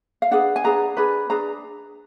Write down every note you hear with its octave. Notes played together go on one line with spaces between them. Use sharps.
F5
D4 G#4 B4 F#5
G#5
D4 G#4 B4 A#5
D4 G#4 B4 B5
D4 G#4 B4 A#5